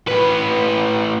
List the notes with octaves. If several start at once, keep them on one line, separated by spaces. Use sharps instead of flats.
A2 B4